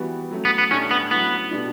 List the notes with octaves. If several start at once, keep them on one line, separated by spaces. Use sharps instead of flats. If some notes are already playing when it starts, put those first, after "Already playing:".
Already playing: E3 G3 B3 F#4
F#3 A3 C#4
B3
B3
A2 G3 C#4 D4 A4 C#5
B3
C#3 F#3 A3 B3 E4
B2 G3 D4